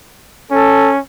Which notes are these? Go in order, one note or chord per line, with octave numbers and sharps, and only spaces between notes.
C#4 A4